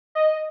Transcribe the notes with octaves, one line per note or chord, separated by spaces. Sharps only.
D#5